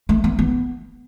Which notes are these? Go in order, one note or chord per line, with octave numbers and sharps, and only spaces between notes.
A3
B3
B3